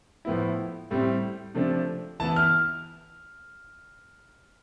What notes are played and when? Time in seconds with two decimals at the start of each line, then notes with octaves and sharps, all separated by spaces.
0.25 A2 F3 B3 E4
0.91 A2 G3 C4 E4
1.55 C3 F3 A3 D4
2.20 E3 A5
2.23 B3 E4
2.36 F6